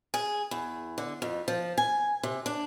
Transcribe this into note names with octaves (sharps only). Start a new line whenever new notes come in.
G#4
E2
D3
F2
F3
G#5
C3
D4